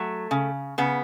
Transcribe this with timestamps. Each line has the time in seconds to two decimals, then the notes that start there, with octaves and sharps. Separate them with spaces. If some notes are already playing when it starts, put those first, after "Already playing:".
Already playing: F#3 A3
0.31 C#3
0.78 C#3 B3